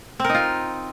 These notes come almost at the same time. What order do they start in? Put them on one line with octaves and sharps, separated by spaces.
C4 A#4 D#4 F4